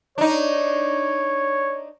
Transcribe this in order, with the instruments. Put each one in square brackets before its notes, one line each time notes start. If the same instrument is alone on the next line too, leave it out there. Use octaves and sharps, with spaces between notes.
[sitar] D4 D#4 [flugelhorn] C#5